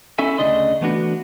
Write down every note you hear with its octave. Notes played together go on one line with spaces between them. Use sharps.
C#4 E4 A4 E5 G#5
D2 G#2 C#3 D4 D#5 C6
E3 A3 B3 D4 F#4